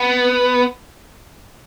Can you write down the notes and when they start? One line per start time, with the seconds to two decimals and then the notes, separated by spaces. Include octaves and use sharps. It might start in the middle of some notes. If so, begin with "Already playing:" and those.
Already playing: B3